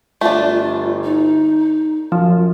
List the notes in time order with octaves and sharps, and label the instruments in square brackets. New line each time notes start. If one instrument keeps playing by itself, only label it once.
[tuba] G1 [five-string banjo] A3 D4 [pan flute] F4
[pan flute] D#4
[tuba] F#2 [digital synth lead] F3